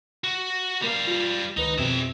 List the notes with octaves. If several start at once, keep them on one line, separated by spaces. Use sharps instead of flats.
F#4
G3 A#3 A#4 F5
F4
C#2 D#3 D#4 B4
F2 B2 C4 G#4 E5